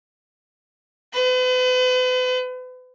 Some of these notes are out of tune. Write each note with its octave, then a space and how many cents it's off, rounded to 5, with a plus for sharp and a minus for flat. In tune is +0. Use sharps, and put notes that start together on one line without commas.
B4 +40